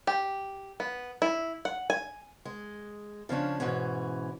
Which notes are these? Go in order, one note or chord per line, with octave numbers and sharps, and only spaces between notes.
G4
B3
E4
F#5
G#5
G#3
C#3 F3 C#4 D4
G#2 B2 E3 C#4